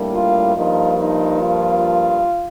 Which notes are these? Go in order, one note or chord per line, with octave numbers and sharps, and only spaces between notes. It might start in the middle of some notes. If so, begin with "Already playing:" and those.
Already playing: A2 G3 A#3 D4
F4
G2 F3 A#3 D#4 F4
D#4
F4